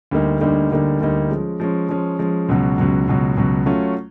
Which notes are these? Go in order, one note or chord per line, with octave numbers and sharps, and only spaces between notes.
D2 D3 G3 A#3 D#4
D2 D3 G3 A#3 D#4
D2 D3 G3 A#3 D#4
D2 D3 G3 A#3 D#4
F3 G#3 C#4
F3 G#3 C#4
F3 G#3 C#4
F3 G#3 C#4
C#2 B2 F#3
C#2 B2 F#3
C#2 B2 F#3
C#2 B2 F#3
F#3 A3 C#4 F4